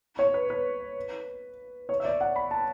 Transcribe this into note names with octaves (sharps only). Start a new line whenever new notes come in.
C#5
B4
B4
C#5
E5
D5
F#5
B5
A5